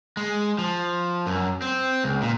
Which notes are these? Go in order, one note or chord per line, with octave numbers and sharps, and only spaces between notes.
G#3
F3
F#2
C4
C#2
A#2